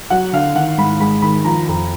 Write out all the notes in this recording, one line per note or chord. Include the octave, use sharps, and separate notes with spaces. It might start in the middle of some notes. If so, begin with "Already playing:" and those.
F#3 F#5
D3 F5
D#3 F#5
G#2 B5
G#3 B5
D#3 B5
F3 A#5
F2 A#5